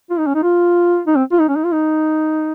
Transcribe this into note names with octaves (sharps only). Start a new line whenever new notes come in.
F4
D#4
C#4
D#4
F4
D#4
C4
F4
D#4
C#4
D#4
F4
D#4